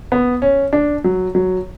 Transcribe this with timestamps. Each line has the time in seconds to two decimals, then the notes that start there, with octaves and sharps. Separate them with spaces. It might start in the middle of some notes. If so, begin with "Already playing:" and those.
0.12 B3
0.42 C#4
0.73 D4
1.04 F#3
1.35 F#3